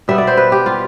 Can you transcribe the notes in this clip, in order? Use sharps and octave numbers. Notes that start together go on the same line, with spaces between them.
B2 G3 B3 E5
D5
C5
B4
G4
F4